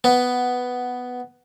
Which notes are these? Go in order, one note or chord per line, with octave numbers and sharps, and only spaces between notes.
B3